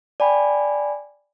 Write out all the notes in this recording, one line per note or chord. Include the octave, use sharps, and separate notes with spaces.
D5 G5 G#5 B5